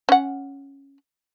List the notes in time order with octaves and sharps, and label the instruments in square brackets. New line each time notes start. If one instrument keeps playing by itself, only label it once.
[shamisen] C#4 F#5